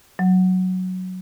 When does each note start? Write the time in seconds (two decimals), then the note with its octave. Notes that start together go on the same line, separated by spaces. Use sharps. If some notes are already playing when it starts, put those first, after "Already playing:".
0.19 F#3